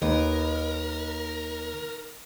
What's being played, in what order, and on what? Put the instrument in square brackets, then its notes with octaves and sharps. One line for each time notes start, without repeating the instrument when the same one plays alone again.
[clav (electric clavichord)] D#2 [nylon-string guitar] D#4 B4 [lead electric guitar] A#4